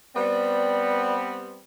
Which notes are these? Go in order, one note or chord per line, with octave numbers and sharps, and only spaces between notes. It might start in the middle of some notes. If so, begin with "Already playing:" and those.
G3 B3 C4 D5